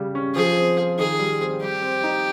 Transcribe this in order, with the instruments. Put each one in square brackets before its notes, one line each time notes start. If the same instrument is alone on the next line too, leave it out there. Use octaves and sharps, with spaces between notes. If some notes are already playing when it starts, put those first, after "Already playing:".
Already playing: [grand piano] C#3 G3
C#4
[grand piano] F3 [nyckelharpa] G#4
[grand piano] C4
F4
[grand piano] D#3 [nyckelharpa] G#4
[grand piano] G3
C4
[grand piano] G3 [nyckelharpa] G4
[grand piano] C4
D#4